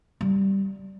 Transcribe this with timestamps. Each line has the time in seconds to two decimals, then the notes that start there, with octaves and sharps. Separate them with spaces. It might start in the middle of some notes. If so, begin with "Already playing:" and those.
0.21 G3